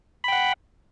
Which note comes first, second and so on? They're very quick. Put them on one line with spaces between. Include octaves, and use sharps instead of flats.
B5 G5 F#5